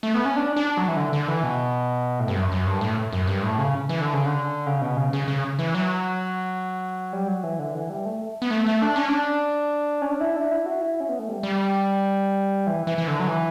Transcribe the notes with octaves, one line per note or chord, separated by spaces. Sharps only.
A3
B3
C#4
D4
D4
F#3
E3
D3
D3
E3
B2
A2
G2
F#2
F#2
G2
A2
F#2
G2
A2
C#3
E3
D3
C#3
D3
C#3
B2
C#3
C#3
C#3
E3
F#3
G3
F#3
E3
D3
E3
G3
A3
B3
A3
A3
D4
C#4
D4
C#4
D4
E4
D4
E4
F#4
E4
C#4
B3
A3
G3
G3
E3
E3
E3
D3
F#3
E3